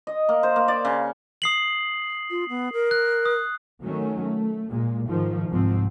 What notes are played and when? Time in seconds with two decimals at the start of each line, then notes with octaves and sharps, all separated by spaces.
0.07 D#5
0.29 A#3
0.43 C5
0.56 A#3
0.68 D5
0.85 C#3
1.42 D#6 C7 F#7
2.30 F4
2.49 B3
2.73 A#4
2.91 F#6
3.26 D#6
3.83 D#3 F#3 A3 C#4
4.21 A3
4.70 A#2 G#3
5.09 G#2 D#3 F3
5.49 C2 G#2 F3 C4